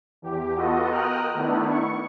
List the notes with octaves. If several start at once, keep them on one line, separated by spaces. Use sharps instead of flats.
E2 G4
B3 F4 F#4 A4 D#5
A#4 D#5 G5 D#6 F6 F#6
D#3 A3 B3 D4 E4
C#6